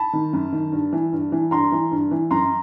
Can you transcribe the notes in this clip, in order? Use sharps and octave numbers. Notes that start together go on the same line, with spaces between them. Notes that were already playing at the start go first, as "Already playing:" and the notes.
Already playing: A5 B5
D#3
F#2
D#3
G2
E3
G2
E3
G2 A#5 C6
E3
G2
E3
F#2 A#5 C6